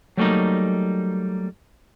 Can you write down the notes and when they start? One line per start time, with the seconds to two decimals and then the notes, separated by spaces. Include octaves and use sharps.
0.17 F#3 G3 A3 A#3 D#4